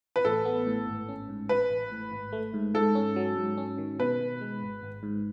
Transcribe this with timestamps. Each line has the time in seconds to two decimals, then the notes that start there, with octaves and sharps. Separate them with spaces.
0.16 B4
0.25 A1 A4
0.45 B3
0.67 A2
0.87 G#1
1.08 C#4
1.29 G#2
1.49 A1 B4
1.70 A1
1.91 A2
2.12 G#1
2.32 A3
2.54 G#2
2.74 G#2 A4
2.95 C#4
3.16 F#3
3.36 G#2
3.57 C#4
3.78 D#3
3.99 B2 B4
4.20 B2
4.41 G#3
4.62 G#1
4.83 G#1
5.03 G#2